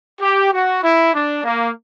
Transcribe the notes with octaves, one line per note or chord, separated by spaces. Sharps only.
G4
F#4
E4
D4
A#3